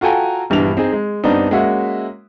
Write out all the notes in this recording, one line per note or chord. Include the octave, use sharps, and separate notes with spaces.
F4 F#4 A4 G5 G#5 A#5
A#1 G2 E3 B3 F7
C4 D#4 G#4
G#3
G2 B3 C4 D4 D#4
G#3 A#3 C#4 F#4 E5